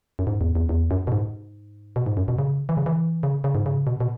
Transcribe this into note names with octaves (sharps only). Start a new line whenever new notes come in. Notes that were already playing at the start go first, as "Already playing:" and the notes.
F#2
G#2
E2
E2
E2
F#2
B2
G#2
B2
G#2
F#2
B2
C#3
E3
C#3
E3
C#3
C#3
G#2
C#3
B2
B2